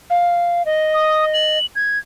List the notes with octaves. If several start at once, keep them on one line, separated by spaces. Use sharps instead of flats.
F5
D#5
D#6
F#7
G#6